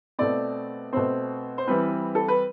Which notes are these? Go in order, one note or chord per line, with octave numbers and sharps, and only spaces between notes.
B2 A3 C4 D5
B2 A3 C4 C5
C5
E3 G3 C4 B4
A4
B4